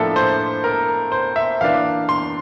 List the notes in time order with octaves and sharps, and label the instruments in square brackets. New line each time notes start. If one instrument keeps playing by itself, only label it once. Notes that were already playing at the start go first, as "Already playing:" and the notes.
Already playing: [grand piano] A2 F3 A#3 D4 A4 E5
C5
A#4
C5
E5
E3 A#3 D4 F5
C6